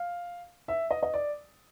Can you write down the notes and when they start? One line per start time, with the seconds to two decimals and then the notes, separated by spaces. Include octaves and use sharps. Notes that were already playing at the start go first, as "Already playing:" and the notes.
Already playing: F5
0.68 E5
0.91 D#5
1.03 D#5
1.14 D5